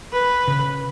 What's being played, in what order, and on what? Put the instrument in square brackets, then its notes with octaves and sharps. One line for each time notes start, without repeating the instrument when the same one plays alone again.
[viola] B4
[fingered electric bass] C#3